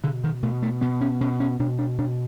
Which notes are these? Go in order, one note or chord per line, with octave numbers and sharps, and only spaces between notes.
B2 D3
D#3
B2 A3
A3
B2 B3
C#4
B2 C#4
C#4
B2 D4
D4
B2 D4